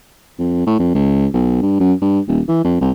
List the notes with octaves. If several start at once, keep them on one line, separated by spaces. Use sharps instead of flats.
F2
A2
F2
C#2
B1
G2
F#2
G2
D#1
E3
F2
C2